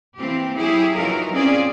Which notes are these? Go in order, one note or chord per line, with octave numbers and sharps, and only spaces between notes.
E3 A#3 C4 G4
F#3 E4 G4 G#4
E3 F#3 D#4 F4 A#4
C4 C#4 F4 G#4 D5